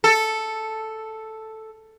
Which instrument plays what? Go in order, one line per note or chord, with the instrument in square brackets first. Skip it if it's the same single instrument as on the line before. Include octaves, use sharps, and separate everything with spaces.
[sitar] A4